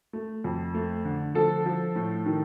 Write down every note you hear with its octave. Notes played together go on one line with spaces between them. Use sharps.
A3
F2
A3
D3
F3 A4
F3
A2
D#3